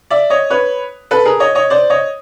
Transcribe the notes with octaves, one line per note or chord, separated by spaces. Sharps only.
D5 E5
C#5 D#5
B4 C#5
A4 B4
G#4 A#4
C#5 D#5
C#5 D#5
C5 D5
C#5 D#5